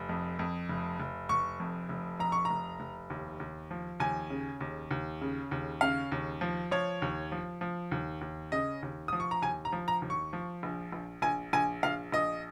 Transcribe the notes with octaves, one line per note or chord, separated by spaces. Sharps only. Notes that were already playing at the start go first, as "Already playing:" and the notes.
Already playing: F1
F2
F2
F1
F1
F1 C#6
F2
F1
F2 A#5
C#6
A#5
F1
F1
D#2
D#2
F3
D#2 G#5
C#3
D#2
D#2
C#3
D#2
C#3 F5
D#2
F3
F3 C#5
D#2
F3
F3
D#2
D#2
C#3 D#5
D#2
F3 D#6
C#6
A#5
D#2 G#5
A#5
F3
A#5
D#2
C#6
F3
A#1
A#1
A#1 G#5
A#1 G#5
A#1 F5
A#1 D#5